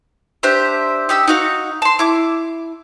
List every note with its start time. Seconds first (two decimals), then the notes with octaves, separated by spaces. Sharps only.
0.43 D4 G4 C5 E5
1.09 D#4 G4 E6
1.28 D#4 F#4 F5
1.82 A5 C6
1.99 E4 D6